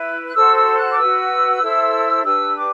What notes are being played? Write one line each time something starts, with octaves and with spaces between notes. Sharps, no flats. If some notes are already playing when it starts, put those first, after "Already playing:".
Already playing: E4 B4
F#6
F#4 A4 C5 E6
E6
F#6
D6
F#4 B4 E6
E4 A4 C5
D4 G4 B4 E6
D6